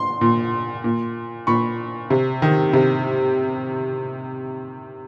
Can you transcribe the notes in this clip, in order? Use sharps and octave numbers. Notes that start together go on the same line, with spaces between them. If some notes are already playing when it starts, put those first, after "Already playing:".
Already playing: C6
A#2
A#2
A#2 B5 C#6
C3
D#3
C3